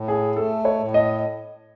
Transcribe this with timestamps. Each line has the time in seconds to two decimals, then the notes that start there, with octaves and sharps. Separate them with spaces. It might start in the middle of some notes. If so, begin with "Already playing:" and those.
Already playing: A2
0.08 G#4
0.37 A3 A4
0.65 C#5
0.80 A2
0.94 D#5